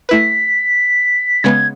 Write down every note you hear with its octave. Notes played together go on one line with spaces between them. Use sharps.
A3 E4 B4 B6
C#3 G#3 B3 G#6